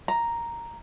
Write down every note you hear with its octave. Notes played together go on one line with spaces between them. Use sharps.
A#5